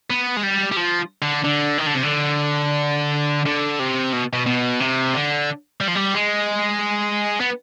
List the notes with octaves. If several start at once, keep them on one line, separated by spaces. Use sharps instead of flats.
B3
G#3
G3
G3
F3
D3
D3
D#3
D3
C3
D3
D3
C3
B2
B2
B2
C3
D3
G3
F3
G3
G#3
B3